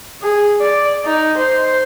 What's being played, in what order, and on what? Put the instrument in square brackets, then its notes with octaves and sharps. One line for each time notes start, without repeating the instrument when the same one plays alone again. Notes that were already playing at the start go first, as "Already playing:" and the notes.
[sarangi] G#4
D5
D#4
C5